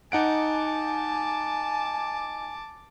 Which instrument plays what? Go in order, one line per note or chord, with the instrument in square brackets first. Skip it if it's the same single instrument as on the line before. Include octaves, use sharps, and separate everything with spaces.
[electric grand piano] D#4 F#5 D7 [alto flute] G#5 [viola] A5 D6